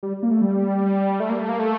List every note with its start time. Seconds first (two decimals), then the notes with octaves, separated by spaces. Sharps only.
0.03 G3
0.23 A#3
0.31 A3
0.42 G3
1.20 A3
1.29 A#3
1.40 A3
1.49 A#3
1.59 A3